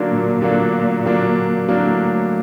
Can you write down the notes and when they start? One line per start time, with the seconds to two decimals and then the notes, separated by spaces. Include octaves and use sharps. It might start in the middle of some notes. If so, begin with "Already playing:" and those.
Already playing: D3 F#3 A#3 D4
0.09 A#2
0.41 A#2 D3 F#3 A#3 D4
1.06 D3 F#3 A#3 D4
1.69 A2 D3 F#3 A#3 D4